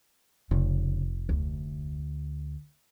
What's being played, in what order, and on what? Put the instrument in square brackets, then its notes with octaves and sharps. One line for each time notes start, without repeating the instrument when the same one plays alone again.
[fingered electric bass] F1 [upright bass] C#3
[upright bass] D2